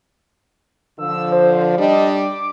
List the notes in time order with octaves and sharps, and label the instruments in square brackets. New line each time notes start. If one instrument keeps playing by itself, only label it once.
[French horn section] D3 F3 [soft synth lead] E6
[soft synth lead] C5
[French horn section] G3 D4 [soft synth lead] D#5
[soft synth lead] D6